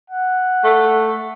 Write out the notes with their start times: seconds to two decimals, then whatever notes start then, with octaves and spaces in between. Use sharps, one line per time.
0.10 F#5
0.64 A3